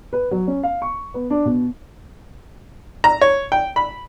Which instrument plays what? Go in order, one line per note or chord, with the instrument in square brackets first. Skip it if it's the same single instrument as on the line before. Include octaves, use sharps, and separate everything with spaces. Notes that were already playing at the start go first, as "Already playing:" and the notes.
[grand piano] B4
F#3
C#4
F5
C#6
B3
D4
B2
[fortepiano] A#5
C#5
G5
B5